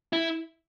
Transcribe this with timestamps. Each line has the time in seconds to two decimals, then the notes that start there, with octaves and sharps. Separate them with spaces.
0.13 E4